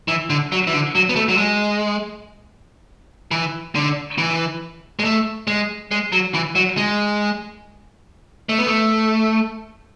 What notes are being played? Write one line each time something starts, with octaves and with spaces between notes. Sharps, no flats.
E3
D3
F#3
E3
D3
F#3
B3
A3
F#3
G#3
E3
D3
E3
G#3
A3
G#3
G#3
F#3
E3
F#3
G#3
A3
B3
A3